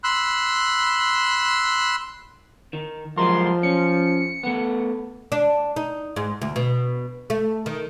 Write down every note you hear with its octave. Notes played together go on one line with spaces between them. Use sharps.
B5 C6 E6 F#6
D#3
F3 F#3 G#3 A#4 C6
C#4 C#7
A3 B3
D4
D#4
G#2
D2
B2
A3
D#3